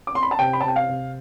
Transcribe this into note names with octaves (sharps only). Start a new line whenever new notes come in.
D6
C6
B5
A5
C3 G5
B5
A5
C3 G5
F5
C3